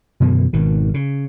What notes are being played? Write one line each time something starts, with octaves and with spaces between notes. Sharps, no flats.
F#2 B2 D3 E3
G#1 B2 D#3
C#3